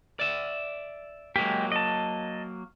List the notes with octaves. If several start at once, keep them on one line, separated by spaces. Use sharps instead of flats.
D5 E5
F#3 G#3 A#3 G4
D#5 A5